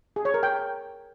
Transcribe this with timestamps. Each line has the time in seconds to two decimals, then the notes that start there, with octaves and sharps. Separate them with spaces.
0.16 G#4
0.25 C#5
0.34 A#4
0.43 G5